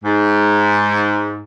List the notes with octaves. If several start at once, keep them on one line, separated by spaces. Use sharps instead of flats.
G#2